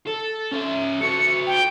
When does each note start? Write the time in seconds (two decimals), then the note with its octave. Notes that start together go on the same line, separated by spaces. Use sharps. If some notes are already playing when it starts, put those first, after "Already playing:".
0.07 A4
0.52 C#4 E5
1.01 F#4 A4 C#7
1.47 G5